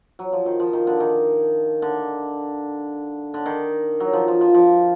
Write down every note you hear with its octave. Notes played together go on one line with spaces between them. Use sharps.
F#3
F3
D#3
F3
D#3
D3
D#3
D3
D3
D#3
F#3
F3
F3
F3
F3